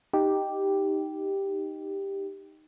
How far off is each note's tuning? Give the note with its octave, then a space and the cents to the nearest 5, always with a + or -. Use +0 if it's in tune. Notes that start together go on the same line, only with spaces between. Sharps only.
D#4 +0 G4 +0